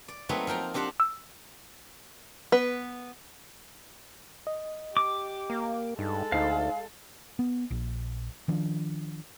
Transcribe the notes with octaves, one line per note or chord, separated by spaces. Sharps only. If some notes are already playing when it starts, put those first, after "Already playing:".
D5
F#3 A3 A#3 C4 D#4 B4
F3 A#4 G5 A#5
C4 D4 G4 C5 F#5
E6
B3 B4
D#5
G4 D6
A#3
G2 G#3 D#4 A4
D2 D#4 C5 F5
B3
A#1
D#3 F3 D4